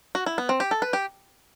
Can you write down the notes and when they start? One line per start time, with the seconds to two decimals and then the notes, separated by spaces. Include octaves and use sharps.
0.15 F#4
0.26 E4
0.38 B3
0.49 C4
0.60 G4
0.71 A4
0.82 B4
0.93 G4